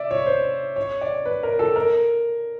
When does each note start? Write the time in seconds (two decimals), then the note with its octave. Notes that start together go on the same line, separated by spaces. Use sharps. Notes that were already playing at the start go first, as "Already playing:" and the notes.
Already playing: D5 E5
0.11 C#5
0.26 C5
0.76 C#5
1.01 D5
1.26 B4
1.43 A#4
1.59 A4
1.76 A#4